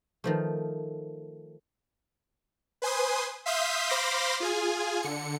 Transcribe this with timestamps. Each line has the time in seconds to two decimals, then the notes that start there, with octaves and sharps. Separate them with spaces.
0.24 D#3 F3 A3
2.82 B4 C5 G#5 C6 D#6
3.46 E5 F5 C6 D#6 G6 B6
3.89 C5 F5 B5 C6 D6 A#6
4.40 F4 G#4 G#5
5.02 D3 C#7